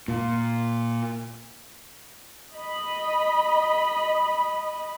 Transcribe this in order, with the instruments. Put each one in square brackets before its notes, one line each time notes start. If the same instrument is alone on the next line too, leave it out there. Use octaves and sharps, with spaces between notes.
[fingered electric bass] A#2
[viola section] D#5 B5